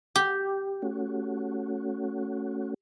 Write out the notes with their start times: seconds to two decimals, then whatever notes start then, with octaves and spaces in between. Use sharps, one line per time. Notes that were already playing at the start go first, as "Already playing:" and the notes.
0.16 G4
0.82 A3 C#4 F#4